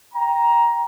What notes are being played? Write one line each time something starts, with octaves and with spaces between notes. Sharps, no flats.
G5 A#5